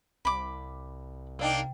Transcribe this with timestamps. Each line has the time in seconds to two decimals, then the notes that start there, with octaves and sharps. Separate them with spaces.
0.25 C2 B5 D6
1.39 C3 A#3 D4 D#4 G5